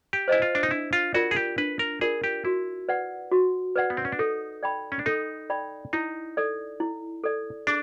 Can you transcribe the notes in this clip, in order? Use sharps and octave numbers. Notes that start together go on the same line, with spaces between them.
G4
E4 C5 D#5 G#5
F4
D4
D#4
D4 E4
F4
F4 F#4 A#4 D5
G#4
G4
D4 B4
A#4
F4 G#4 A#4 D5
G4
E4 F#4
B4 D5 F#5
F#4
B4 D5 F#5
B3
C4
C#4
D4
D#4 A4
D5 G5 B5
C#4
D4
D#4 A4
D5 G5 B5
D#4 E4
A4 D5
E4
A4 D5
D4 G#4